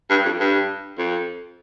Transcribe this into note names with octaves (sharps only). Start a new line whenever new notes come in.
G2
F2
G2
F2